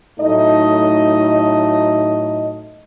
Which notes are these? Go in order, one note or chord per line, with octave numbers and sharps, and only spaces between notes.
A2 F#3 A3 D#4 D#5